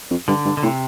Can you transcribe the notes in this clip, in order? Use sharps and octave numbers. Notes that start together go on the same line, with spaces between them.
F2
G2 D3
G2
D3
A2 C3